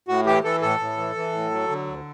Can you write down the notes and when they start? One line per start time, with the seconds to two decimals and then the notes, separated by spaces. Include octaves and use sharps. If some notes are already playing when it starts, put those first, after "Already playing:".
0.08 A2 F#4
0.26 E3 G4
0.44 E3 A4
0.62 A2 A4
0.80 A2
0.97 E3
1.15 E3
1.33 A2
1.51 F#3
1.69 D3
1.87 D2